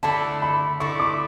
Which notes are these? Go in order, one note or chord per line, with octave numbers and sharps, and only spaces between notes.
D3 A3 E4 A5
B5
D3 A3 E4 C#6
D6